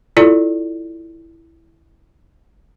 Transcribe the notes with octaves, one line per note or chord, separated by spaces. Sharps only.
E4 F4 A4 D5